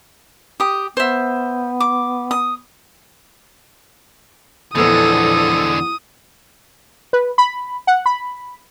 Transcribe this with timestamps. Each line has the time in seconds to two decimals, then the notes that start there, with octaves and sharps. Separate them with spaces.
0.60 G4 D#6
0.97 B3 C5 E5
1.80 D6
2.31 D#6
4.75 E2 A#2 D3 F3 G#3 B3 A4 D#6
7.13 B4
7.38 B5
7.87 F#5
8.06 B5